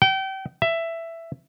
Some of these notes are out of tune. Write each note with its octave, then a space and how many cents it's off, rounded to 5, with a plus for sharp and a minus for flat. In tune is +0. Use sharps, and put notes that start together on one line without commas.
G5 -30
E5 +10